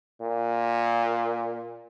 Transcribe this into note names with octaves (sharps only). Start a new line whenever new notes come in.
A#2